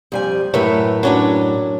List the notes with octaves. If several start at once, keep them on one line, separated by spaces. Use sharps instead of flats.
F2 G3 G#5
F#2 A2 A#4 B4 C#5 E5
F#3 C#4 D4